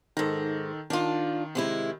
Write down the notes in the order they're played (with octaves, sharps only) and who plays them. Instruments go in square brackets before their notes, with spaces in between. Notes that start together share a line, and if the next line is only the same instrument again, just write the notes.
[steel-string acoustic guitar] G#2 A#5 [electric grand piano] D#3 A4
[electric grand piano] D#3 [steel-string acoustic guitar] D4 F4
[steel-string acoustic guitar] C3 G#3 E4